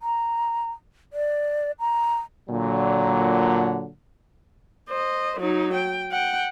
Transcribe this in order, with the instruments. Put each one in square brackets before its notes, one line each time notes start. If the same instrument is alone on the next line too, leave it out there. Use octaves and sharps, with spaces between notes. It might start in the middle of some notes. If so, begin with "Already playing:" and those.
[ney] A#5
D5
A#5
[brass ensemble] A#2 D3 F#3
[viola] C5 D#5
F#3 D#4
G5
F#5 G5